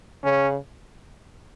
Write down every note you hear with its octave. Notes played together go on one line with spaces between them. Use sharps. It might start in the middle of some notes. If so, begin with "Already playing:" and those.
C#3 C#4